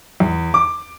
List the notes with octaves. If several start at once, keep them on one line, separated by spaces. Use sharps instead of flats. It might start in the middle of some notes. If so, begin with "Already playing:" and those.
E2
D6